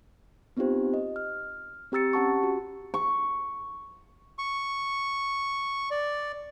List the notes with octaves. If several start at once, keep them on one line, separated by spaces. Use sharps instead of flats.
B3 C4 D#4 F4 G4 C5
D#5
F6
C4 G4 A#5 E6 A6 C#7
C#4 G4 F#5 A5 C#6
F#4
C#6
C#6
D5